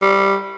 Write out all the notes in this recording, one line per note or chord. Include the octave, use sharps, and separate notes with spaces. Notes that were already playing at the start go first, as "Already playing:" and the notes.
G3